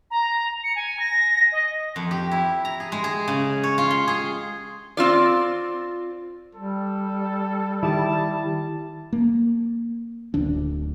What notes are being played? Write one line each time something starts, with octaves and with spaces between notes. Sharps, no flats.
A#5
C#7
G#5
A#6
D#5
F2
G4
E4
A#5
G#4
G#3
G#4
C#3
C#5
F4
C6
G#4
C4 F4 D5
G3 A4
D#3 E4 G4 A5
A#3
D1 D2 D3 D4